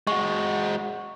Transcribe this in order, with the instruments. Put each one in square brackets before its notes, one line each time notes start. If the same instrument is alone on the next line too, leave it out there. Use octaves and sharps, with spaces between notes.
[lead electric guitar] G#3 F#4 [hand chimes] C#6